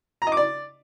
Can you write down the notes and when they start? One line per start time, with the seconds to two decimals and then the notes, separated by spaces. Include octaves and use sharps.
0.22 A#5
0.27 D#5
0.32 D6
0.37 D5